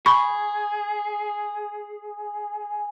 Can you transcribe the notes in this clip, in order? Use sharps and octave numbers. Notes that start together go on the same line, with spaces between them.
G#4 B5 C#6